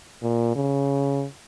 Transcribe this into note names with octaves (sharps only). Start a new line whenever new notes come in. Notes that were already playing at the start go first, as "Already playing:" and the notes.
A#2
C#3